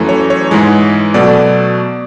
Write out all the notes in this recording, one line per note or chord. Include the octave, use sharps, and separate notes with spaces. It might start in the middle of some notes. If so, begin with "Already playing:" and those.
Already playing: F#2 E3 A3
C#5
C#5
G#2 E3 G#3
B2 F#3 A3 D5